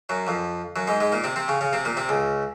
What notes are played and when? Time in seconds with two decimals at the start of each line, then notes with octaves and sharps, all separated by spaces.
0.09 F#2 F#3
0.27 F2 F3
0.76 F#2 F#3
0.87 G#2 G#3
1.00 G#2 G#3
1.12 A#2 A#3
1.24 C3 C4
1.36 C3 C4
1.48 C#3 C#4
1.61 C#3 C#4
1.73 C3 C4
1.85 A#2 A#3
1.97 C3 C4
2.09 C#2 C#3